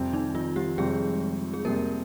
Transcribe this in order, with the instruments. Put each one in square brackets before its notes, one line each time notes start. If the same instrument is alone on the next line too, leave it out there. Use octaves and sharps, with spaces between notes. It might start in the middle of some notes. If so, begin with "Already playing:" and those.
Already playing: [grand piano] F2 C3 G3 C4
[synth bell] D#3 D#4
F3 F4
G3 G4
[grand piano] F2 C3 G3 C4 [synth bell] G#3 G#4
[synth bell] G#4
[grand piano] F2 C3 G3 C4 [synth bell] A#3 A#4